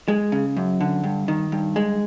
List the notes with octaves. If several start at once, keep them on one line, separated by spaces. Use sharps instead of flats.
G#3
C#3
F#2
D3
G2
D#3
G2
G#3